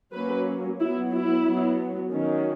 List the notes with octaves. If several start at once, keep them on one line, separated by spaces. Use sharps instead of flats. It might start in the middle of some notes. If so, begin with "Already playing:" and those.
F#3 A#3 C#4 B4
F#3 B3 E4
E4
F#3 B3
D#3 F#3 C#4